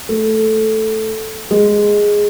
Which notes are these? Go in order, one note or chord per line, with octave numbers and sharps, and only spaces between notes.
A3
G#3